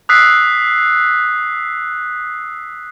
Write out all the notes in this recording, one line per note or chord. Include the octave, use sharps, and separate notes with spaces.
D#6 E6 F#6 B6 C7